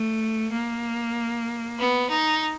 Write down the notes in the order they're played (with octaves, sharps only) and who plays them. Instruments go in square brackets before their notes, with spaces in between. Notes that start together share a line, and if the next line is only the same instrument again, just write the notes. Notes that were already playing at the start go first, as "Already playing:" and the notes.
Already playing: [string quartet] A3
A#3
B3
D#4